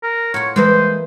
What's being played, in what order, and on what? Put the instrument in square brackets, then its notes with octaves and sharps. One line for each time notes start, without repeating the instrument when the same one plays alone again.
[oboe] A#4
[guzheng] A2 F4 [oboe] C#5 [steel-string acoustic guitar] F#5
[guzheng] E3 A#3 E4 [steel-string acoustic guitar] G#3 B4 [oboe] C5